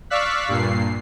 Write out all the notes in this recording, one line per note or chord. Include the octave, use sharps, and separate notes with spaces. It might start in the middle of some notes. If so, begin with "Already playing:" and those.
D5 F5 C#6 E6 F#6 B6
G2 A#2 C7